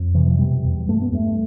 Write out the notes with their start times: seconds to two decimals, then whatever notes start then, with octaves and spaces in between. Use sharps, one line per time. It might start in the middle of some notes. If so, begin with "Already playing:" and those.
Already playing: F2
0.15 C3 E3
0.26 F3
0.39 B2 G3
0.64 E2
0.88 G2 A3
1.02 B3
1.12 G2 A3